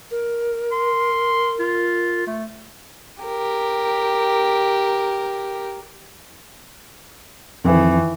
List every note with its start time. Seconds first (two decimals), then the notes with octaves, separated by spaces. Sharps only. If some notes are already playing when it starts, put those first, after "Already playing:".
0.11 A#4
0.72 C6
1.60 F4
2.27 A3
3.23 G4 A#4
7.65 F2 D#3 E3